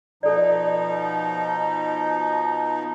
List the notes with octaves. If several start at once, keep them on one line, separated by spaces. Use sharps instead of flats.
B2 F3 D#4 A4 D5